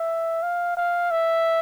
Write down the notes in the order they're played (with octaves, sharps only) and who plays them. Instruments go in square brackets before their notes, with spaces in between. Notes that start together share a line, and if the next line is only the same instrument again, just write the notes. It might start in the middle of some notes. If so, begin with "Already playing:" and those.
Already playing: [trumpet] E5
F5
F5
E5